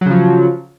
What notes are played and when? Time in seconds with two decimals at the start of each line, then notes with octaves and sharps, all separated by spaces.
0.01 F#3
0.06 C#3
0.10 F3